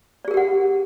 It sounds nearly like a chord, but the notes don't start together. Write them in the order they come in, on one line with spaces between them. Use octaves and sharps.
D5 G#4 A#4 G4 F#5